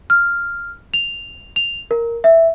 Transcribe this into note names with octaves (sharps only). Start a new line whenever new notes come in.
F6
F7
F7
A#4
E5